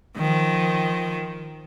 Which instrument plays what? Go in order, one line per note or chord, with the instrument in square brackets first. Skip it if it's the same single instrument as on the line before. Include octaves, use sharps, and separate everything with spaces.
[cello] D#3 F3